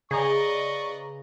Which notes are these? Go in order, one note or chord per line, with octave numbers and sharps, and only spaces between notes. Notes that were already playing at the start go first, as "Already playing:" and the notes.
C#3 G#4 B4 D5 D#5 A#5 C#6